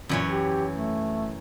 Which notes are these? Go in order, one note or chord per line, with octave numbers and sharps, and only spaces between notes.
F#2 A#2 E3 C#5
G4
A3